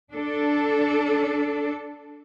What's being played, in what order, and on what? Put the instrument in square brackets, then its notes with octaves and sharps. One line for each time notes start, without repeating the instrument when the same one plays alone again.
[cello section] D4 A4